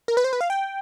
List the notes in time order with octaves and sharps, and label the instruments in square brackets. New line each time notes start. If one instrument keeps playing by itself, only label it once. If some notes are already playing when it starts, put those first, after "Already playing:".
[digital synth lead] A#4
B4
C5
B4
F5
G5